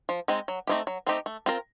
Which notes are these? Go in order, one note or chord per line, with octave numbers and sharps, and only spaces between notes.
F3
G#3 C4 D#4
F#3
A3 C4 D#4 G4
F#3
A3 C4 D#4 G4
A3
C4 F4 A#4